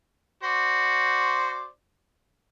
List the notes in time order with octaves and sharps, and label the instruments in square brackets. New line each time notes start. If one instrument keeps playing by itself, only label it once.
[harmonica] F#4 C5 D5